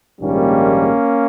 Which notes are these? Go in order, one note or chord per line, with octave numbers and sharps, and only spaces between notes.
A#1 G#2 D#3 G3 A#3 C#4